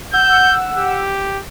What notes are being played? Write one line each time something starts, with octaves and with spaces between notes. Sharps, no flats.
F#5 E6 G6
G4